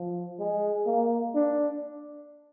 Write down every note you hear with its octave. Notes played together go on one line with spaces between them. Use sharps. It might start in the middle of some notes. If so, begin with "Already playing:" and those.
Already playing: F3
G#3
A#3
D4